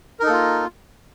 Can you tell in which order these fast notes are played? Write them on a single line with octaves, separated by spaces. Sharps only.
A#4 D#4 A4 A#3 F4